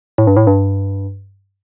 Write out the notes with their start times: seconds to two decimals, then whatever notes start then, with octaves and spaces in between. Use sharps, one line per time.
0.18 A2
0.27 G2
0.37 A2
0.47 G2